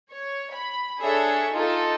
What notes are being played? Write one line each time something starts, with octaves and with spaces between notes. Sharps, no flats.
C#5
B5
D4 G#4 A4 C#5 E5
D#4 F4 A4